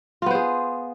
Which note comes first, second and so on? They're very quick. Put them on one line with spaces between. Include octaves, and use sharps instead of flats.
F4 B3 C5 G#4